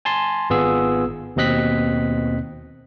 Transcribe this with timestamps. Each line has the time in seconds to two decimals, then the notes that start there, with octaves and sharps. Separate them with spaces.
0.05 G#5 A5 C6
0.50 G#1 B3 F4 G#4 E6
1.36 D#2 B2 C4 D#5 F#6 B6